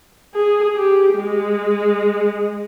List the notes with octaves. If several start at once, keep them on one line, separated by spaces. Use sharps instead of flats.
G#4
G4
G#3